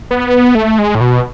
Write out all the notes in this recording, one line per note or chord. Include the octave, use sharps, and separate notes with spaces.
B3
A3
G#3
A2
B2